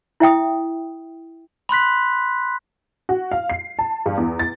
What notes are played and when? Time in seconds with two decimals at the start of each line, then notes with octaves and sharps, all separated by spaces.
0.20 E4 E5 G5 D#6
1.69 B5 C6 F#6 B6
3.09 F#4
3.32 F5
3.50 C7
3.79 A5
4.06 G2
4.17 E2
4.39 A6